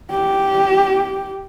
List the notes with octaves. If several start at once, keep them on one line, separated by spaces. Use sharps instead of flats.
G4